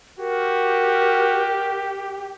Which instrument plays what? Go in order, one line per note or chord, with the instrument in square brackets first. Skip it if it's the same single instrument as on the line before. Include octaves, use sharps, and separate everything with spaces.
[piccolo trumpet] F#4 [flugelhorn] G4 [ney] A#4